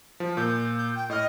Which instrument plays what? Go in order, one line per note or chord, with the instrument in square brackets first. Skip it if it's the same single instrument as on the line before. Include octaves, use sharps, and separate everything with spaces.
[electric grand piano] F3
[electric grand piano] A#2 [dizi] G6
[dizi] G6
G5
[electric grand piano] A2 F6 [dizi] D#5